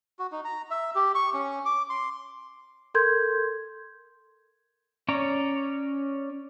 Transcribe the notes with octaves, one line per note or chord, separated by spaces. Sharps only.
F#4
D#4
A#5
E5
G4
C#6
C#4
D6
C6
A4 A#4 C6 G6 G#6
C#4 C#5 D5 A#5